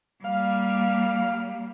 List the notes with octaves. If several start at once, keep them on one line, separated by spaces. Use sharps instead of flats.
G3 A#3 F5